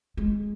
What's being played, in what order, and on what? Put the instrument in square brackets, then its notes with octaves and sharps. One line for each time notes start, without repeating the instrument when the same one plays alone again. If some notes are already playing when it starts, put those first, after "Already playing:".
[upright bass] G#3